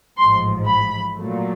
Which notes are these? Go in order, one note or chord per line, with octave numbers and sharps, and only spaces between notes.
A1 G#2 F3 C6
B5
A#2 F#3 A3